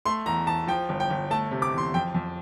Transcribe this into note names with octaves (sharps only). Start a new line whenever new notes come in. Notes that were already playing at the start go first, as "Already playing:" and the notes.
A3 C6
E2 A#5
E2 A5
F3 G5
G1
G5
G1
A3 A5
C3
D6
E2
C6
F2 G5
F2